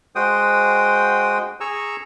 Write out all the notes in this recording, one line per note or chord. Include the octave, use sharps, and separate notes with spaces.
G#3 F#4 C5 G5 D#6
G#4 G#5 A#5 C#6 E6